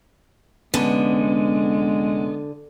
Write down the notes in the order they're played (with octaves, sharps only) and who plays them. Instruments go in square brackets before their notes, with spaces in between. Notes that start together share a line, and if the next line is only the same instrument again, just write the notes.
[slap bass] F1 A2 C#4 [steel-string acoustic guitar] D3 [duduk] G#3 [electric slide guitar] B3